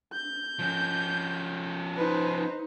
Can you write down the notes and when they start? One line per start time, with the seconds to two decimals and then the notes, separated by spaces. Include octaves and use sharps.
0.13 G6
0.59 F3 C#4
1.97 D#4 B4 C5